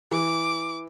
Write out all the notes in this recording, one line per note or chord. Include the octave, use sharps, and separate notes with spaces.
E3 D6